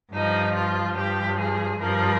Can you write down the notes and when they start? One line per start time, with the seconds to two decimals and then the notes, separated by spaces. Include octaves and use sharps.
0.13 G2 F3 D#4
0.54 F4
0.96 G2 F3 G4
1.38 G#4
1.80 G2 F3 A#4